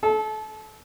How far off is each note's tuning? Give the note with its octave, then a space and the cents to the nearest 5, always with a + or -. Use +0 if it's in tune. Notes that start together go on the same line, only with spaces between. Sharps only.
A4 -30